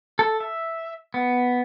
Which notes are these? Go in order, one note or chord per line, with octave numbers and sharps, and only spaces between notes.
A4
E5
B3